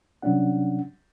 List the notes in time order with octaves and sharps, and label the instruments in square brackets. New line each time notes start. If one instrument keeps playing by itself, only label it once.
[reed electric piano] C3 F#3 G3 C#4 D4 F#5